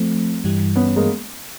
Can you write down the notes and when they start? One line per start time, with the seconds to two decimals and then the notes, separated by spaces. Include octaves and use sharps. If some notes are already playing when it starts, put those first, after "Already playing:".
Already playing: F3 A3 C4
0.44 G2 E3 G3
0.76 B3 C#4
0.96 G#3 A#3